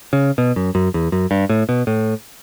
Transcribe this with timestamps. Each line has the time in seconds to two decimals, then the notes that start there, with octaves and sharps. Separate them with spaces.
0.13 C#3
0.38 B2
0.56 F#2
0.75 F#2
0.94 E2
1.12 F#2
1.31 G2
1.49 A2
1.69 B2
1.87 A2